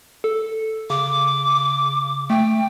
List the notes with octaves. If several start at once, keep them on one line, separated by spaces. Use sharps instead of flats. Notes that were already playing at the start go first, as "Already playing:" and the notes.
A4
C#3 D6
A3 G5